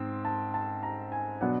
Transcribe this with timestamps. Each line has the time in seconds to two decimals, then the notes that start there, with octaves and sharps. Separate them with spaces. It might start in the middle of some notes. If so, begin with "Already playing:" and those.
Already playing: G#2 C4
0.25 A5
0.54 A5
0.83 A#5
1.12 G#5
1.41 B2 F#3 B3 D4 F#5